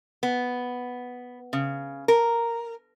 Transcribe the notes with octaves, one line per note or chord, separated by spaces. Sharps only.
B3
C#3
A#4